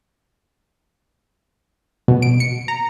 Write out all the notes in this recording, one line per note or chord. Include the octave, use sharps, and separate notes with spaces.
B2
D7
C#7
A#5